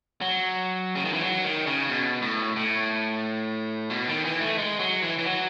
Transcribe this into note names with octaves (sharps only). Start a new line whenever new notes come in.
F#3
C#3
D#3
E3
F#3
D#3
C#3
B2
A2
A2
B2
D#3
E3
A3
G#3
F#3
E3
E3
F#3